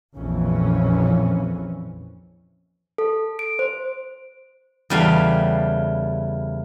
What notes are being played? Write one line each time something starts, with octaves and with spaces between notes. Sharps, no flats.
A#1 F2 A#2 E3 C#4
A4
D7
C5
E2 C#3 G3 A3 F5